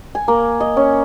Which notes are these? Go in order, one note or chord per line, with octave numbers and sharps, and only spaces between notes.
G#5
A#3
D#5
C#4